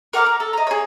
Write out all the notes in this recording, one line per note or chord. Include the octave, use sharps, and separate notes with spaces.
A#4 F#5 D6 F6
A#4
A4
D#5 A#5
G#4 C#5